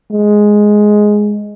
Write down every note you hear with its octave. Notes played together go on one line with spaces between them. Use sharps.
G#3